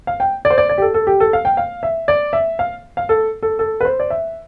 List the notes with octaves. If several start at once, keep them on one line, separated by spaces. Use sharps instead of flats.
F5
G5
D5
C5
D5
D5
G4
A4
A4
G4
A4
F5
G5
F5
E5
D5
E5
F5
F5
A4
A4
A4
B4
C5
D5
E5